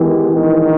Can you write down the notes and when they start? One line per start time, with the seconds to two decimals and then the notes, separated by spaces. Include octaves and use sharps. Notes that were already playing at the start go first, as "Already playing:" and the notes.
Already playing: D#3 E3 G#3 B3 G4 A#4
0.32 A#1 G#2 D#3